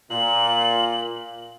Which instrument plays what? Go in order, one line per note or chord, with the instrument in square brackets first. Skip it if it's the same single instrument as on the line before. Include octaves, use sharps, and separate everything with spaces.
[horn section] A#2 [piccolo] F#7